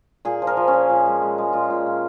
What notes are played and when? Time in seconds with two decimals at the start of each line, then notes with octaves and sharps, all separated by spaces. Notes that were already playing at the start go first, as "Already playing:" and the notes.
0.25 A#2 G#4
0.42 F3
0.47 A#4
0.57 F3
0.68 C#4
0.73 A#2
0.89 A#2
1.06 G#3
1.22 G#3
1.38 G#3
1.53 A#2 F4
1.70 A#2
1.86 A#2